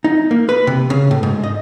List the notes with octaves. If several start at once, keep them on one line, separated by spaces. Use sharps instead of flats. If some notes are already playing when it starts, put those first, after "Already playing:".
D#4
A#3
B4
C3
C#3
A2
G#2
D#5